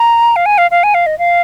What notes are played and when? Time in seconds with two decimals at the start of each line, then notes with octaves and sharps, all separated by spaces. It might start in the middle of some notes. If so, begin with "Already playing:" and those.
Already playing: A#5
0.36 F5
0.46 G#5
0.58 F5
0.71 F5
0.83 G#5
0.94 F5
1.06 D#5
1.19 F5